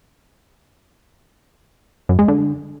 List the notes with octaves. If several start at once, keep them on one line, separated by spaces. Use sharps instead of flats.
F#2
G#3
D3